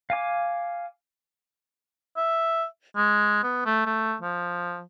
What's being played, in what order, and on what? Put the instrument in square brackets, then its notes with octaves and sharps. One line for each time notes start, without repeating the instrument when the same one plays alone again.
[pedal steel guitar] F5 G#5 D6
[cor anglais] E5
G#3
B3
A3
A3
F3